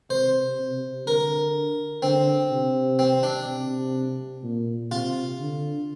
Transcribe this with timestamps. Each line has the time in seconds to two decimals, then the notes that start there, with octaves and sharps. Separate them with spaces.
0.10 C3 C5
0.59 C3
1.07 D3 A#4
2.02 D3 C4
2.51 C3
2.99 C4
3.23 D4
3.47 C3
4.43 A#2
4.91 C3 F4
5.39 D3